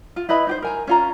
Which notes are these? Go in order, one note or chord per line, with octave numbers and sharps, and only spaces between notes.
F4
E4 B4 D#5 B5
D#4 G4 C5
A#4 G#5 A#5
C#4 F4 A#5